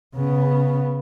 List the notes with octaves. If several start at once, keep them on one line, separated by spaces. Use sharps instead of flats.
C#3 B3